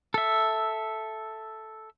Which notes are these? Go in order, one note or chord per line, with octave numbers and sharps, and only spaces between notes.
A4 E5